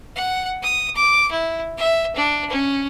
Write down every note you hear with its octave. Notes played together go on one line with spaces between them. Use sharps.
F#5
D#6
D6
E4
E5
D4
C#4